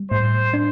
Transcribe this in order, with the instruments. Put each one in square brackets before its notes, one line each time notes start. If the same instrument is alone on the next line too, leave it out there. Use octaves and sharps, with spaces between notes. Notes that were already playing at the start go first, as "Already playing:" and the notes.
Already playing: [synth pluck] G3
[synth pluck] A2 [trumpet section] C5
[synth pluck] D4